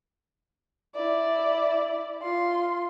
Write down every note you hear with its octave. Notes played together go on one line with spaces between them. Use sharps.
E4 D5
F4 C6